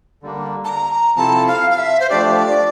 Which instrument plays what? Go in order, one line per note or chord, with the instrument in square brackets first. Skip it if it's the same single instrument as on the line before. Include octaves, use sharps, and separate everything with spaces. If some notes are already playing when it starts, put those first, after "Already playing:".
[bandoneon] D3 G3 A#3 D4
[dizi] A5
A#5
[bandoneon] C3 F3 C4 E4 A4 [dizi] A5
[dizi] F5
F5
E5
C5
[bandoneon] F3 A3 D4 G4 [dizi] D5